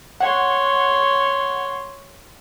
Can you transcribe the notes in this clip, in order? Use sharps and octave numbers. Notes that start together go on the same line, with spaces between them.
C#5 F#5 C6